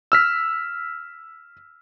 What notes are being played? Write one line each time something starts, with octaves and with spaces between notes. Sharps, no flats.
E6 F6 B6